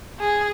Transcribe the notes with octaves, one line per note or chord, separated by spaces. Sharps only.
G#4